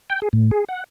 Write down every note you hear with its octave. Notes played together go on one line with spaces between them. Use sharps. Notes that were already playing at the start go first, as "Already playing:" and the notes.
G5
G#4
A2
G#4
F#5